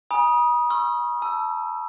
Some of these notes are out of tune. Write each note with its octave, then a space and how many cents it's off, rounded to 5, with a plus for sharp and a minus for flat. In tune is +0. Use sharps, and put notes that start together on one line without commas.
G#5 +0 B5 -45 D#6 +0
C6 +45 E6 +35
A5 +0 E6 +20